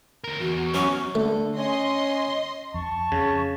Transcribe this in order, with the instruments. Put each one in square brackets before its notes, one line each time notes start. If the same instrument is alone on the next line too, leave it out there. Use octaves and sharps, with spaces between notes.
[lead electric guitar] D2 A#4
[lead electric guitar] E2 [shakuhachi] F#4
[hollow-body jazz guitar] F#2 C#4 [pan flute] C#6
[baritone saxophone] D3 [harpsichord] A3
[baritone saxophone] C#4 [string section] D#5 C6
[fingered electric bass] F2 [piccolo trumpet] A5 [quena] C#6
[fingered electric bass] F2 [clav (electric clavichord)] C#3